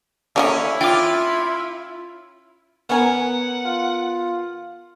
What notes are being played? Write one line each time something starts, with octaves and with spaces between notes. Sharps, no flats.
D3 F#3 A#3 C#4 E4
F4 G5 D6
B3 C#4 A#4 F#5 G#5 A#5
F4